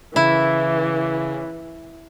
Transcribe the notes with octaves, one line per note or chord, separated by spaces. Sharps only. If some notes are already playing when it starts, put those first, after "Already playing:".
C#3 E3 E4